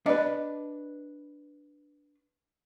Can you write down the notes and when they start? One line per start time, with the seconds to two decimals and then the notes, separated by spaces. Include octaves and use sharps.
0.06 D4 B4 D#5